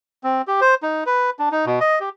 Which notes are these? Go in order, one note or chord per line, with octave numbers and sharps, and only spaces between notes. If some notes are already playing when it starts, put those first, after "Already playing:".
C4
G4
C5
D#4
B4
D4
D#4
B2
D#5
G4